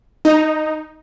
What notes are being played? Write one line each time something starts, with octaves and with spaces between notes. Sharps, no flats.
D#4